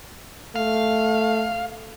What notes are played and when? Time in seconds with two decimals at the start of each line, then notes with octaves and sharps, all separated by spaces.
0.56 A3 F5